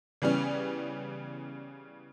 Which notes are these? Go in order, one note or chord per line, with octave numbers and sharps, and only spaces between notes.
C#3 E3 G3 B3 C#4